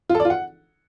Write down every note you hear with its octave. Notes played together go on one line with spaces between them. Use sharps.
F4
A4
D5
F4
F#5